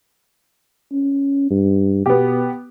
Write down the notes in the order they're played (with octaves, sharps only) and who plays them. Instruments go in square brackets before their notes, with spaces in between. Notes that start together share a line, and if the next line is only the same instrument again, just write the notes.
[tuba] C#4
G2
[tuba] B2 [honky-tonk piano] B3 G4